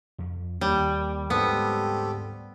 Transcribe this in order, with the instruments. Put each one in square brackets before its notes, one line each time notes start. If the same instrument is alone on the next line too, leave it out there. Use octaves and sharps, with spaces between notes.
[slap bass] F2
[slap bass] D#2 D#3 A#3 [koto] G3
[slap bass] D2 G#2 G#3 [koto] B3 [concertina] C4 G4 A4